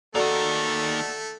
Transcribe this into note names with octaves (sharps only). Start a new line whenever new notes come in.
D#3 A3 A#3 F#4 A4 D5